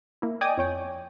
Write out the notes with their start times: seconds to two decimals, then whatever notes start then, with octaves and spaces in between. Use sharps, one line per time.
0.22 A#3 E4
0.41 D5 D#5 G5 G#5 D6 D#6
0.58 F2 C#5 G5